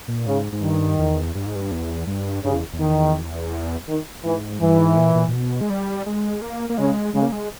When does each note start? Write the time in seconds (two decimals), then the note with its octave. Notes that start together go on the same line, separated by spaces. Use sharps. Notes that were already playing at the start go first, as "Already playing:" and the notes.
0.08 A#2
0.26 G#2 C#3
0.53 G#2
0.62 G2 D#3
0.99 E2
1.35 G2
1.46 G#2
1.55 G2
1.72 E2
2.07 G2
2.43 G2 C#3
2.54 E2
2.73 E2
2.80 D#3
3.88 D#3
4.24 G#2 E3
4.61 G2 E3
4.78 G#2
4.97 A#2
5.15 A#2
5.29 A#2
5.33 B2
5.61 G#3
5.70 G3
6.06 G#3
6.42 A#3
6.70 A#3
6.78 C#3 G#3
7.14 C#3 G#3
7.23 A#3
7.32 G#3